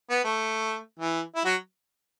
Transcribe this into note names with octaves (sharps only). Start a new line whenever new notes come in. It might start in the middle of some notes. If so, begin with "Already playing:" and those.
B3
A3
E3
E4
F#3 F#4